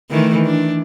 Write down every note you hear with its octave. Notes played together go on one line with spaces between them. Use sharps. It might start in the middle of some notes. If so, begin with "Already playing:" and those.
D#3 E3 A3
D4